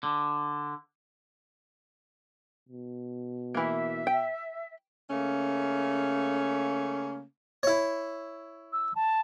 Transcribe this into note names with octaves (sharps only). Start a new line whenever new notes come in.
D3
B2
E3 A#3 E5
G5
C#3 A3 A#3 C#4
E4 C#5
E6
A5